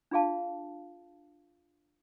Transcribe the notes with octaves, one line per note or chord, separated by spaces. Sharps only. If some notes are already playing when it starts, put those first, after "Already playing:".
D4 F4 G#4 F5 A5